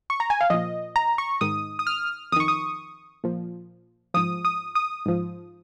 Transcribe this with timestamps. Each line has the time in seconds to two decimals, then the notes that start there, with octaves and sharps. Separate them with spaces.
0.10 C#6
0.20 A#5
0.30 G#5
0.41 F5
0.50 A#2 F3 D#5
0.96 A#5
1.18 C#6
1.41 G#2 D#3 D#6
1.79 D#6
1.87 F6
2.32 F2 D#6
2.36 D#3 C#6
2.48 D#6
3.24 A#2 F3
4.14 G#2 F3 D#6
4.45 D#6
4.75 D#6
5.06 G#2 F3